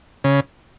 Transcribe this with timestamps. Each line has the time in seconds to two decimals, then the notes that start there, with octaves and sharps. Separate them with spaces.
0.24 C#3